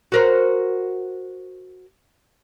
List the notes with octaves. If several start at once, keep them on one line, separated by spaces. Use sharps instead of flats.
F#4 A#4 C5